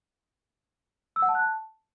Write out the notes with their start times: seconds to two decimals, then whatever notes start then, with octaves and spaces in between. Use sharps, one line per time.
1.16 E6
1.22 F#5
1.29 A5
1.35 F#6
1.41 A5